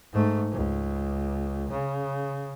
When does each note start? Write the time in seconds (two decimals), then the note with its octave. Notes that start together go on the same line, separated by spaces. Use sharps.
0.12 G#2 A3
0.52 C#2
1.71 C#3